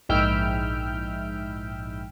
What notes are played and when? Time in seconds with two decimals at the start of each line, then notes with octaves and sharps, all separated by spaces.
0.09 A#1 G#2 E4 E5 G5 F6